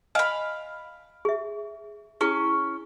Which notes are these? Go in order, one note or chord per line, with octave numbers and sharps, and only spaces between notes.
D#5 F5 G#5 B5
G#4 E5
C#4 E4 G#4